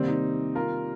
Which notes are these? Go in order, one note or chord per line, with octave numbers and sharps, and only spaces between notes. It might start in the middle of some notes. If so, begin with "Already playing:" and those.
Already playing: C3 D#3 G3 A#3 C4
D#4
F4 A#4